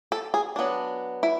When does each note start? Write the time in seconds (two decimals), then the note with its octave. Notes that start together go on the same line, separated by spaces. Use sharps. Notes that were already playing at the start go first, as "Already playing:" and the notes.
0.12 A4
0.34 G#4
0.56 F#3 B3 D4
1.23 E4